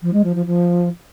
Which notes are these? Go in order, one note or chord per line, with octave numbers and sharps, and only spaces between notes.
F3
G#3
F3
F3
F3